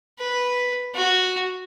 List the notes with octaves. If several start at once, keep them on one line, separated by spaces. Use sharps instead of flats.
B4
F#4